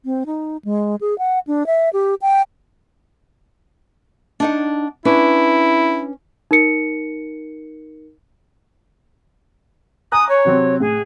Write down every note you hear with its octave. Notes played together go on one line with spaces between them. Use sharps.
C4
D#4
G#3
G#4
F#5
D4
E5
G4
G5
D4 D#4 F#5
C#4 D4 E4 B4
D#4 A#4 C#7
G#5 A#5 D#6 F#6
C#5
C3 F#3 C4
A2 G#4